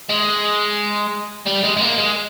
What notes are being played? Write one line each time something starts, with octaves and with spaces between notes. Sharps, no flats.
G#3
G3
G#3
G#3
A#3
G#3